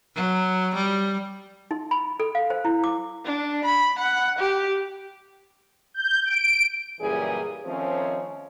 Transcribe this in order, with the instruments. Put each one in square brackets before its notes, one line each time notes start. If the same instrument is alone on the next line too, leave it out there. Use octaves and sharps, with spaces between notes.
[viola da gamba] F#3
G3
[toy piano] D#4
B5
A4
F5
C5
E4
D6
[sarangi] D4
B5
F#5
G4
[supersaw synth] G6
D7
[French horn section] F#2 A#2 C#3 E3 G3 G#4
D#3 F3 A3 C4 C#4